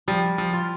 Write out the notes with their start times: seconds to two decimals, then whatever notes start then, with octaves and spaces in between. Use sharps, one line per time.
0.08 F3 G3
0.38 F3
0.53 F4